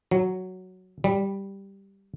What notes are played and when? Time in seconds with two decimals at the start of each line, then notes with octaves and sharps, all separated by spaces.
0.11 F#3
1.04 G3